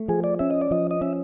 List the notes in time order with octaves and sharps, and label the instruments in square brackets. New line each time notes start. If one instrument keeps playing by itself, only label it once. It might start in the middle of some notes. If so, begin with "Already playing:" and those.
Already playing: [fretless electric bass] A3
[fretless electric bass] F3 [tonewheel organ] G#4
[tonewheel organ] D5
[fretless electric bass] C#4 [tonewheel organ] E5
[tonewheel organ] D#5
D5
[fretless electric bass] F3 [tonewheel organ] D#5
[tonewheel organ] D#5
[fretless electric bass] C#4 [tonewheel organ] E5